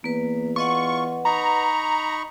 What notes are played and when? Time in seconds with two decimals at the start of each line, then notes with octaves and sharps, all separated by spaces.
0.04 E2 A#3 B4
0.56 F4 B4 D#5 F#5 C#6
1.25 D#4 A#5 B5 C#6